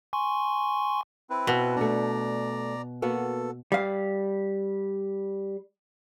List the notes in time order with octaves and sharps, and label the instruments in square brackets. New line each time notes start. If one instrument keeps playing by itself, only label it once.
[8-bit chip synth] G#5 C6 C#6
[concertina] C4 E4 B4
[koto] B2
[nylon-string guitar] A3 D4 [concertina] D5 A#5
[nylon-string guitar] A#3 B3 F#4 [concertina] A4
[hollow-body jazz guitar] G3 F5